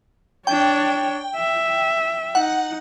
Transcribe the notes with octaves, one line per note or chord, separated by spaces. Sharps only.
D4 C#5 G5
E5
D#4 F#5